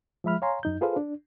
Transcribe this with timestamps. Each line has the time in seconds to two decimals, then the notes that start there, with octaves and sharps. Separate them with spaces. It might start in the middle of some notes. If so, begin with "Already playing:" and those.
0.24 F3 G#3 E5 B5 F6
0.42 C#5 F5 G#5 A#5 C6
0.63 F#2 D#4 G6
0.81 F4 G#4 A4 B4 C5 F5
0.96 D4